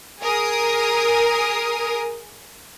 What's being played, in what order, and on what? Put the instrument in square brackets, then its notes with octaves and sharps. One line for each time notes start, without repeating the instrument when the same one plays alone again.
[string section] G#4 A#4 D#6